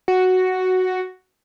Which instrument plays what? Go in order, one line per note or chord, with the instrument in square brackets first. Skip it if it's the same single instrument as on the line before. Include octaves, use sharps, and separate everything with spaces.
[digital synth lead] F#4